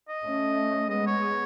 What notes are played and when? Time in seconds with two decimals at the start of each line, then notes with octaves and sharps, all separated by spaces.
0.09 D#5
0.25 A3 C#4
0.90 G#3 B3 D#5
1.07 C#5